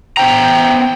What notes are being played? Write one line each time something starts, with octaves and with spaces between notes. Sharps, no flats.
B3 C5 G5 A#5